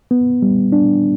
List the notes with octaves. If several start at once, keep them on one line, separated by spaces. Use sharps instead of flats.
B3
G3
D4